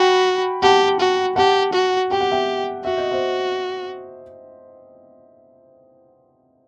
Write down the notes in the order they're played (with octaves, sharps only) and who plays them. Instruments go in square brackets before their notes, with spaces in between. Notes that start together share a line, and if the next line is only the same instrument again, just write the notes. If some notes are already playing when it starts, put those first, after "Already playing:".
Already playing: [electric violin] F#4 [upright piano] G5 B5
[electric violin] G4 [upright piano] F#5 A5
[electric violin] F#4
[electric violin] G4 [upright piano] F#5 A5
[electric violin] F#4
[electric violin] G4 [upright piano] G5
[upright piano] F#5
E5 G5
[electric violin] F#4 [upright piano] E5
[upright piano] D#5
C5 E5